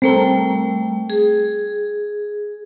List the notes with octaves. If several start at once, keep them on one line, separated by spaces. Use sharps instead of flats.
G3 A3 C4 A4 A#4 G5
G#4